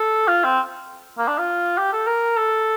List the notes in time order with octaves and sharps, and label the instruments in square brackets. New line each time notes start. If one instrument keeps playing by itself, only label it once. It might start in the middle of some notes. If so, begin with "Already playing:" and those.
Already playing: [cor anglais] A4
F4
C4
A#3
D4
F4
G4
A4
A#4
A4